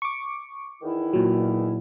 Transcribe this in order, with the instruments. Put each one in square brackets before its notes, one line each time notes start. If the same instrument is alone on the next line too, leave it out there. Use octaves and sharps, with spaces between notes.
[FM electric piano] C#6 D6
[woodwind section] E2 D#3 E4
[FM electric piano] A#2 F#3